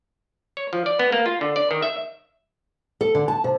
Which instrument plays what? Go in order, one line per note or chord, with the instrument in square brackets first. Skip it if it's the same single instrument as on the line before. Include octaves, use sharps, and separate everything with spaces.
[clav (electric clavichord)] C#5
F3
D5
B3
A#3
F4
D3
D5
D#3
E5
[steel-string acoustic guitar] A4
D3
A5
C3